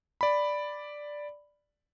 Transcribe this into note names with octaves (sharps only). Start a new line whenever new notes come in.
D5 B5